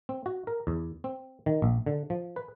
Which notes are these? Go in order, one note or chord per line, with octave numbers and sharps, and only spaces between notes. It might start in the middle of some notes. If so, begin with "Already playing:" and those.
C4
F#4
A#4
E2
C4
D#3
A#1
D3
F3
B4